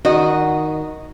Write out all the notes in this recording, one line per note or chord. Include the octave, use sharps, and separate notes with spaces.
D#3 F#4 D#5